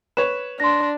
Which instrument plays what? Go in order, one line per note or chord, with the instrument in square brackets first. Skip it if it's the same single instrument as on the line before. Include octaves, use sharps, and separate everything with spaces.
[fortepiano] B4 C#5 [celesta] E7
[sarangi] D4 [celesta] C6 A#6